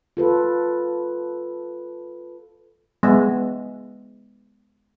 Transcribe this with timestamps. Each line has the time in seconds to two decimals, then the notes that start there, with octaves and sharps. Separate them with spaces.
0.17 F4 A4 B4
3.03 G#3 B3 E5